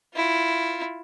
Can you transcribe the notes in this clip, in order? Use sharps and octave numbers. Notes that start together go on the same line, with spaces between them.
E4 F4